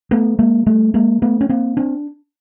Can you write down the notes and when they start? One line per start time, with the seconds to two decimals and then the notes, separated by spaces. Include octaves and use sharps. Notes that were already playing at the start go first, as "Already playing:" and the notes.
0.11 A3 B3
0.39 G#3 A#3
0.66 G3 A3
0.94 G#3 A#3
1.22 A3 B3
1.41 C#4
1.49 A#3 C4
1.77 C4 D4